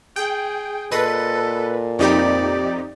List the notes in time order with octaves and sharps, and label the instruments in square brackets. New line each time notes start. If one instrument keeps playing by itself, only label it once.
[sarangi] G#4 [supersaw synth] G5
[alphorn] A#2 [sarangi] A4 [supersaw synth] B4 [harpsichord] D#5 C6
[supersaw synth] F2 D#4 G4 [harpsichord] C3 B5 [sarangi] D5